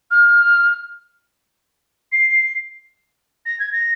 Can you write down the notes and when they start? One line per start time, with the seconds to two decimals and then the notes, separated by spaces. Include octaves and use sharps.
0.11 F6
2.12 C7
3.46 A#6
3.60 G#6
3.72 A#6